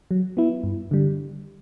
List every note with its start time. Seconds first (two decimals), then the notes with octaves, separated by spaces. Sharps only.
0.11 F#3
0.37 B3 E4
0.64 G2
0.91 D3 G3